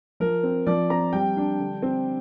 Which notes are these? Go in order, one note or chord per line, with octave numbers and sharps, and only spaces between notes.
F3 A#4
C4
F3 D5
C4 A#5
G3 G5
D4
D3
C4